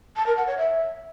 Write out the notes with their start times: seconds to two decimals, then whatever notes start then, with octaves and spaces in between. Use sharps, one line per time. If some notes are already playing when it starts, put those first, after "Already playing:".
0.16 A5
0.27 A#4
0.37 F#5
0.47 C#5
0.58 E5